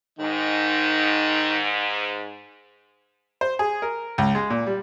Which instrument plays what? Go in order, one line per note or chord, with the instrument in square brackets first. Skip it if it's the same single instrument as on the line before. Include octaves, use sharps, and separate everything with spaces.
[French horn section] G#2 [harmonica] D#3
[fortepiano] C5
G#4
A#4
C#2
G#3
A#2
G3